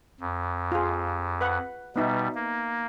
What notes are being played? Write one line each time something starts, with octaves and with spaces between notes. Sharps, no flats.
F2
F4 G#4
B4 F#5
B2 G3 B3 D#4 E5
A#3